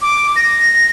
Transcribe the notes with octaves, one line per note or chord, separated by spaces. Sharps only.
D6
A#6